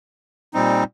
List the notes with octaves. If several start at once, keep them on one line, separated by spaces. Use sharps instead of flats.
A#2 G3 C4 D#4